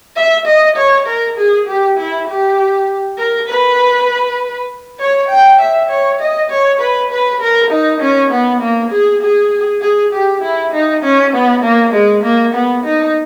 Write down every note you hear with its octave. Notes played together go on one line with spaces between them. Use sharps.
E5
D#5
C#5
A#4
G#4
G4
E4
G4
A#4
B4
C#5
G5
E5
C#5
D#5
C#5
B4
B4
A#4
D#4
C#4
B3
A#3
G#4
G#4
G#4
G4
E4
D#4
C#4
B3
A#3
G#3
A#3
B3
D#4